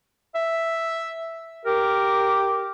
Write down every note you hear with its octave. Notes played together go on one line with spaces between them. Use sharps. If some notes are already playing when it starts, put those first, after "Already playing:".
E5
G4 A#4